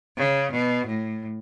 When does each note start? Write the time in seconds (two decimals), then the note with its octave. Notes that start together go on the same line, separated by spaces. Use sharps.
0.17 C#3
0.52 B2
0.87 A2